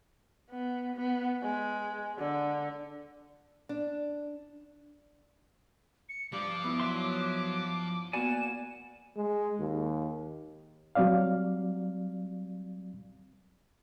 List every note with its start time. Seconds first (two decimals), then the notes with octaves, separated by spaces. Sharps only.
0.50 B3
0.96 B3
1.43 G#3
2.18 D3
3.69 D4
6.09 C#7
6.32 G2 F3 D6
6.64 B3 E4
6.80 F#3 E5 C6
8.13 A#3 B3 F#4 D5 F#5 G#5 E7
9.17 G#3
9.59 D#2
10.95 F#3 G3 C4 D5 F5